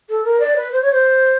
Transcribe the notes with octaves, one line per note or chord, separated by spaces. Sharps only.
A4
A#4
D5
B4
C5
C#5
C5